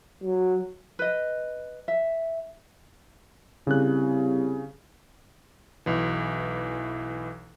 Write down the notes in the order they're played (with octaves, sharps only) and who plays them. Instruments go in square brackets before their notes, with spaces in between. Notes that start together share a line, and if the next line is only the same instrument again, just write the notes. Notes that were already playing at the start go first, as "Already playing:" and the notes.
[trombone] F#3
[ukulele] B4 D#5
E5
[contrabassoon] C2 [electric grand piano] C#3 F#6
[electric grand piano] B1 E3